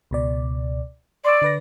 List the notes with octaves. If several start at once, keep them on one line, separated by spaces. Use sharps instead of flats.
C#2 B2 D5
D5 C6 C#6 E6
D3 B4 A#6